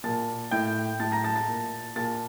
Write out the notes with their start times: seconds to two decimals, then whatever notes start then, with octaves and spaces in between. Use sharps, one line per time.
0.04 A#2 A5 A6
0.51 A2 G5 G6
1.00 A2 A5 A6
1.12 A#5 A#6
1.24 A5 A6
1.36 A5 A6
1.48 A#2
1.96 A#2 A5 A6